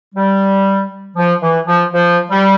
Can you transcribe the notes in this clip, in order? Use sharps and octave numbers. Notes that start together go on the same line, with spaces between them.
G3
F3
E3
F3
F3
G3